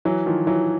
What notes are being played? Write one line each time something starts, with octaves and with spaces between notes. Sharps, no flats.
E3 F#3
D#3 F3
E3 F#3